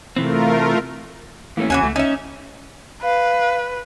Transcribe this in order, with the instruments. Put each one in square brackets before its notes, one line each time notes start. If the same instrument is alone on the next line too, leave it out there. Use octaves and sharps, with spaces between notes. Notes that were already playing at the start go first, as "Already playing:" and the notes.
[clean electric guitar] C3 E3 C4 [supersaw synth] A3 F4 A#4
[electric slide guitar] E3 A3 C#4 [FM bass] A#3
[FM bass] D#2 [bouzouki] E3 F#4 G#5 [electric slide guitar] C#4
[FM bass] C#2 [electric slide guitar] A3
[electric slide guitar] C#4 [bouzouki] D#4 E5
[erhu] B4 [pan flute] F5